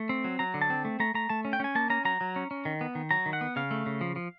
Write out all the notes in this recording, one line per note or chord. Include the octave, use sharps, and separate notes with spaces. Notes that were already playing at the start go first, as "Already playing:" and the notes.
Already playing: A3
C4
F#3
F#3 A#5
D3
A5
C4
A3
A3 A#5
A3 A#5
A3 A5
C#4
G5
C#4 G#5
A#3 A5
C#4 A#5
F#3 A#5
F#3
C#4
C#4
D#3
B3
D#3
F#3 A#5
D#3
F#5
B3
C#3 F5
A3
C#3
F3
F3